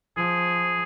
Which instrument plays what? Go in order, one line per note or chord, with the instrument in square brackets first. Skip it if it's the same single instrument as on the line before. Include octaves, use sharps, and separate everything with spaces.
[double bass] F3 [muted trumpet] G#4